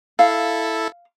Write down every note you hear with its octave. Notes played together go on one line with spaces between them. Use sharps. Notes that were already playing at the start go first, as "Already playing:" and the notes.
E4 A4 F5